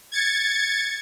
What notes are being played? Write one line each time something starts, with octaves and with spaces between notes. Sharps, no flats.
G#6 A6 C#7